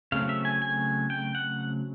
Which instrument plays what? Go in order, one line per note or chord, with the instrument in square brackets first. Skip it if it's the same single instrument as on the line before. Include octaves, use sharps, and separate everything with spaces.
[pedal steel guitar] C#3 F#3 A3 C4 F5
E5
G#5
G#5
G5
F#5